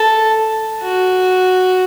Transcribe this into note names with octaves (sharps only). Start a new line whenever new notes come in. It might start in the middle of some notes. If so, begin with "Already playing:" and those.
Already playing: A4
F#4